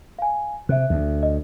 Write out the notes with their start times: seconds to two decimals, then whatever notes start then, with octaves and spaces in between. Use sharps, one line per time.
0.19 F5 G#5
0.69 C3 E5 F#6
0.90 D2
1.23 D#5